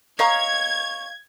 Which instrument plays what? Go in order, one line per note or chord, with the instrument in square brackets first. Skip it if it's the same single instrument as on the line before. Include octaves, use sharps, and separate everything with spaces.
[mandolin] C#5 [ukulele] D#5 F5 A#5 [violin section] G#6